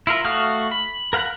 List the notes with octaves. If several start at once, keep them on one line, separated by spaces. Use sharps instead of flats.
E4 F4 A#4
A3 F#4 F5 D#6 F6
B5
A#4 F5 F#5 B5 F#6